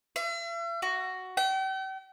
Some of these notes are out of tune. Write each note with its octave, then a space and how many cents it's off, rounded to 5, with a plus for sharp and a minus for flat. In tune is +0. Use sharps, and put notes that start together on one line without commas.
E5 +45
F#4 +5
G5 -40